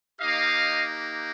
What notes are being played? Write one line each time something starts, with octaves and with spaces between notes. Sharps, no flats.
A#3 D#4 G4 D#5 F5